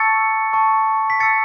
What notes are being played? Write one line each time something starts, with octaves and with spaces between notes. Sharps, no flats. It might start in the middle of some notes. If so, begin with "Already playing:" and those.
Already playing: A5 C#6 E6 A6 C#7
A5 C#6 E6
B6
A5 E6 A6 C#7